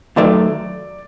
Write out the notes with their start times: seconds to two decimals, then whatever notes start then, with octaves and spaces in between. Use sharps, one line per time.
0.16 D#2 D#3 F#3 A3 D5